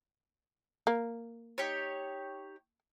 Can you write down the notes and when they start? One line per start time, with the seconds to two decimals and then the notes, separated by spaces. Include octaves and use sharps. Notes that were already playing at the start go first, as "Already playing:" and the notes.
0.87 A#3
1.58 D#4 G4 C#5